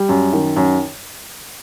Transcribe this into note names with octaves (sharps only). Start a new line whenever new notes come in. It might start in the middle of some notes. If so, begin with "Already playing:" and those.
Already playing: G3
F#2
D#3
F#2